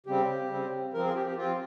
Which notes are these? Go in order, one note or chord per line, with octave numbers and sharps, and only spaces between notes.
C#3 G3 C4 G4
C#3 G3 C4
F3 C4 A#4
G#4
G4
G4
C4 F4
F3